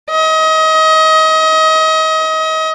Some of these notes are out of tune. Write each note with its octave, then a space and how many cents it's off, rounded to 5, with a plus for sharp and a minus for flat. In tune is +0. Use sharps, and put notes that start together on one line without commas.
D#5 +30